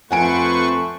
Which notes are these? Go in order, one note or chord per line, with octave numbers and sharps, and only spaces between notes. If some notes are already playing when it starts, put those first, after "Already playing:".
F2 A3 B4 C5 F#5 G#5 C#6 D7